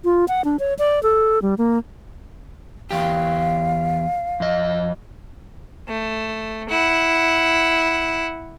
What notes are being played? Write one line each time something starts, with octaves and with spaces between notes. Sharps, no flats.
F4
F#5
D4
C#5
D5
A4
G3
A#3
E2 G4 F5
F2 D#5
A3
E4 F#5